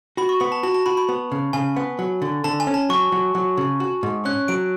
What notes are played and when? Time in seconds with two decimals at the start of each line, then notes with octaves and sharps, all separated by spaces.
0.17 F#4 B5
0.29 C#6
0.40 B3 B5
0.52 A5
0.63 F#4 A5
0.74 A5
0.86 F#4 B5
0.97 B5
1.09 B3
1.32 C#3
1.53 C#3 G#5
1.76 B3
1.99 F#3
2.22 D3
2.44 D3 A5
2.60 G#5
2.67 C#4
2.74 A5
2.89 F#3 C#6
3.12 F#3
3.35 F#3
3.57 C#3
3.80 F#4
4.03 G#2
4.25 C#4 F#6
4.48 F#3 D7